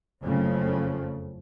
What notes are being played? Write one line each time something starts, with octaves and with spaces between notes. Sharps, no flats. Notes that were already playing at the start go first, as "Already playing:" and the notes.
F#1 F2 C#3 F3 A3